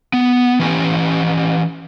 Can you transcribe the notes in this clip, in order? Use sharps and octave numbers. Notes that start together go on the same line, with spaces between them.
B3
E3 C#4 G4